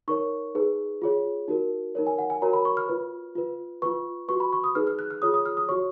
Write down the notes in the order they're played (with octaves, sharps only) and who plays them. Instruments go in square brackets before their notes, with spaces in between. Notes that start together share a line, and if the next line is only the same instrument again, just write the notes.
[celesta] D#4 A#4 C#5 C#6
D#4 G#4 B4
F4 G#4 C#5
D#4 F#4 A#4
D#4 A#4 C#5
G#5
F#5
G#5
F#4 A#4 C#5 A#5
B5
C#6
F6
F4 B4
F4 B4
F4 B4 C#6
F#4 B4 C#6
B5
C#6
D#6
D#4 G#4 B4 F6
F6
F#6
F6
F4 G#4 C#5 D#6
D#6
F6
D#6
F#4 C#5 C#6